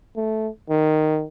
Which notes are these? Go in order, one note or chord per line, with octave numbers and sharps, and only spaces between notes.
A3
D#3